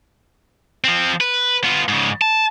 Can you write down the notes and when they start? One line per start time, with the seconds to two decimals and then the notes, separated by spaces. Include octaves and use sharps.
0.84 F3 C4
1.21 B4
1.64 B3 F4
1.88 G#2 C#3
2.21 A5